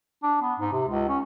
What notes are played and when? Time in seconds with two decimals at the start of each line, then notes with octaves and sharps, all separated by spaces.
0.23 D4
0.42 B3
0.59 G#2
0.73 C3
0.88 C#2
1.09 C#4